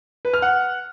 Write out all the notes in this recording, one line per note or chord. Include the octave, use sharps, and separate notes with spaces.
B4
F6
F#5